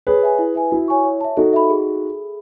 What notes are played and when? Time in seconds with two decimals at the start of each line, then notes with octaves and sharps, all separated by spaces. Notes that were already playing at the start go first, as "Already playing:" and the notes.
0.07 G#4 B4 C#5
0.23 E5 G#5
0.39 E4
0.55 B4 E5 G#5
0.71 E4 F#4
0.88 C#5 G#5 C#6
1.05 C#5
1.21 E5 A5
1.37 D#4 F#4 A4
1.53 E5 B5
1.70 G#4